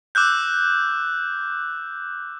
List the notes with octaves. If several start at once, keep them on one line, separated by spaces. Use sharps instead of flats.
D6 E6 F#6 G6